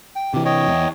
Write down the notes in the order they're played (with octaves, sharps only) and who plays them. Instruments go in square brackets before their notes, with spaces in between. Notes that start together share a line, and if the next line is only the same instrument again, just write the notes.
[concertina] G5
[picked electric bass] C3 E3 [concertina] G4
[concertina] C#5 D#5 G5
[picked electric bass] E2